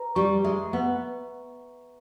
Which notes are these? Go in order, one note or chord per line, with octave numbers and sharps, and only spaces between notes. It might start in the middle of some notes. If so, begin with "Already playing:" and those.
Already playing: B4 A#5
G3 C#6
G#3 E5
B3 B4